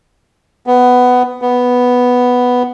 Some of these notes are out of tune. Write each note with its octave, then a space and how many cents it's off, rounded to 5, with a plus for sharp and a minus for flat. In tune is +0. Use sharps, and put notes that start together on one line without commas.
B3 +10
B3 +0